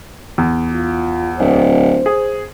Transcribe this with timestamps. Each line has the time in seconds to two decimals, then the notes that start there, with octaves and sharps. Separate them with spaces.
0.38 E2
0.73 F4
1.39 D1 C5
2.06 G#4